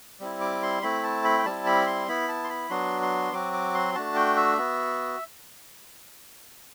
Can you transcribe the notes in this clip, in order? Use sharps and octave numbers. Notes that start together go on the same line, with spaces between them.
G3 C4 E4
D6
C6
A3 C4 E4 B5
A5
B5
G5
G3 C4 E4 A5
B5
C6
B3 E4 B5
A5
C6
B5
F#3 B3 D4 F#4 C6
C6
F#3 C4 F#4 D6
D6
C6
A3 D4 F#4 A5
G5
E5
B3 F#4